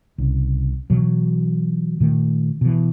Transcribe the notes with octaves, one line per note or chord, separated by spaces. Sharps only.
C2 C#3
B2 E3 F#3
A#2 D#3 A3
B2 E3